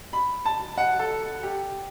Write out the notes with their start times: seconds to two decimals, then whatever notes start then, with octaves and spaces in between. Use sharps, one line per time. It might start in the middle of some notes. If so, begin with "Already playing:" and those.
0.13 B5
0.45 A5
0.78 F#5
0.99 A4
1.43 G4